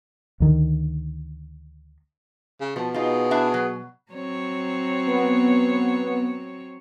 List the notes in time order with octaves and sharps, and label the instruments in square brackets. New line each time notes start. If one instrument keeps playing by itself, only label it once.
[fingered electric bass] D2 D#3
[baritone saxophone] C#3
[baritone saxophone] B2 [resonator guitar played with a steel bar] F3
[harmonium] B3 G#4 [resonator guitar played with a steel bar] D#4 F4
[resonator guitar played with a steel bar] D4 E4 E5
F#3
[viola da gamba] F#3 C4 C#5
[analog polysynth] B3